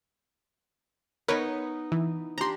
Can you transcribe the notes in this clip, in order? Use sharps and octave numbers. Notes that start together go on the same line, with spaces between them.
B3 D#4 A#4 B4 C#5
E3
D4 G4 A#5 C6